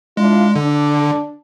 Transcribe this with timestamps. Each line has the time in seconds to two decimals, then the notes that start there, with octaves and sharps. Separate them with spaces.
0.17 G#3 D4 E4 F4
0.56 D3 D4